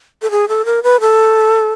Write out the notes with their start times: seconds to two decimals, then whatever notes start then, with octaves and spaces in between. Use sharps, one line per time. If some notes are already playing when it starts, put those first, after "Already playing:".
0.22 A4
0.31 G#4
0.49 A4
0.65 A#4
0.83 B4
1.01 A4